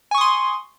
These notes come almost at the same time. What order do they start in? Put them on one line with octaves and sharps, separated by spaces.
G#5 C#6 D#6 C6